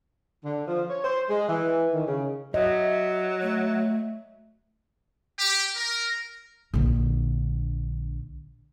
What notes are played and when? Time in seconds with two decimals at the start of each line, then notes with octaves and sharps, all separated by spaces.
0.44 D3
0.68 F3
0.90 C#5
1.05 C5
1.29 G#3
1.48 E3
1.93 D#3
2.07 C#3
2.54 F#3 D#5 E5
3.42 A3
5.39 G4
5.77 A#4
6.74 A#1 D3